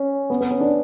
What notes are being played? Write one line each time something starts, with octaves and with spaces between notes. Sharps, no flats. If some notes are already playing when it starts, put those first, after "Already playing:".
Already playing: C#4
B3
B3
C#4
D4